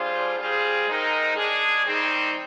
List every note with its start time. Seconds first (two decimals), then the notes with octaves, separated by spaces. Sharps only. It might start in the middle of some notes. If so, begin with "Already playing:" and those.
Already playing: G3 D4 F4 G#4 C5
0.38 G3 C4 F4 G#4
0.87 G#3 C4 D#4 A#4
1.36 G#3 D4 G#4
1.85 D#3 G3 C4 D#4